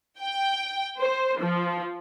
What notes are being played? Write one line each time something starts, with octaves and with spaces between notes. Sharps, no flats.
G5
C5
F3